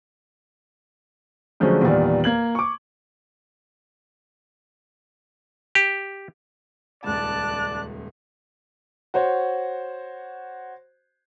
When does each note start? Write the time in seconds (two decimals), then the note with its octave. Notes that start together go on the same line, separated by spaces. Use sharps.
1.60 D3 F3 F#3 G#3 A3 C#4
1.81 E2 A#2 D#3 G3
2.24 A#3 G#6 F#7
2.55 C#6 D6
5.75 G4
7.04 D#1 C#2 D5 A5 F#6
9.14 F#4 C5 C#5